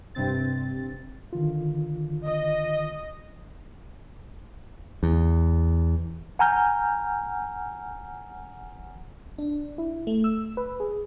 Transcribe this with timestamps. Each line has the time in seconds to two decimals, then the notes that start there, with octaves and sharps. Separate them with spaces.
0.15 G2 C3 C4 A6
1.33 D3 D#3 F4
2.26 D#5
5.03 E2
6.39 F#5 G#5 A#5 F6 G6
9.38 D4
9.78 E4
10.07 A3
10.24 E6
10.57 B4
10.80 G#4